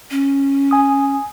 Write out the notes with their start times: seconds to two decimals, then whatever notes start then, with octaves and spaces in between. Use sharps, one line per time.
0.11 C#4
0.71 G#5 D#6